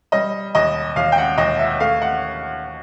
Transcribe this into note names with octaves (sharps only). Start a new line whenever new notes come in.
G3 D#5
D#2 D#5
D#2 F5
G5
F#5
D#2 D#5
E5
A3 F5
F#5